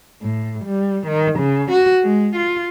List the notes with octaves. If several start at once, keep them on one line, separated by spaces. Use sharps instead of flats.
A2
G3
D#3
C#3
F#4
G#3
F4